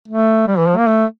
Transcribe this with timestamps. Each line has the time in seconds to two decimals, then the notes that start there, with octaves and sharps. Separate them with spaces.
0.08 A3
0.48 G3
0.58 E3
0.68 F3
0.77 A#3
0.87 A3